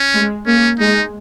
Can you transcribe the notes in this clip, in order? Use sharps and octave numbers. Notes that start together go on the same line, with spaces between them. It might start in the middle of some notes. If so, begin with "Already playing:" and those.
Already playing: C#4
G#3
A#3 C#4
G#3 D#4